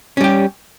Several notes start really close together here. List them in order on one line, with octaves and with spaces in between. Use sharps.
C#4 G3 G4